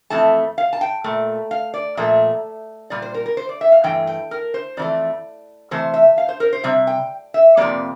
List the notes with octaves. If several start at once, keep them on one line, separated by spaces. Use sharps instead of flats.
F2 E3 A3 A5
F5
A5
G5
A#2 A3
F5
D5
A#2 F3 A3 E5
A#2 G3 D5
C5
A#4
A#4
C5
D5
E5
F5
G2 E3 A3 G5
G5
A#4
C5
F2 E3 A3 D5
C3 E3 A3 C5
E5
F5
C5
A#4
C5
C3 G3 E5
G5
E5
F2 C3 G3 A#3 D5